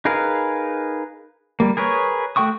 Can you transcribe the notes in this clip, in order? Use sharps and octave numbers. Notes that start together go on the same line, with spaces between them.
D#4 G#4 A#4 B4 F5
G3 A#3
G#4 A#4 B4 C#5
A3 F#4 G5 C#6 D#6